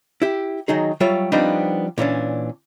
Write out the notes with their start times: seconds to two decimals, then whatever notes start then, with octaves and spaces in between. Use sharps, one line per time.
0.22 E4 G4
0.68 D#3 F#3 D#4 G#4
1.00 F#3 G3 F4 C#5 E5
1.32 F3 G3 B3 C4 D4 D#4
1.98 A#2 E3 C#4 D4